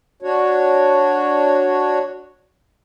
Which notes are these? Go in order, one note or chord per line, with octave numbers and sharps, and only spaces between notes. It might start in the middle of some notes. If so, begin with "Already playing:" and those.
D4 F#4 C#5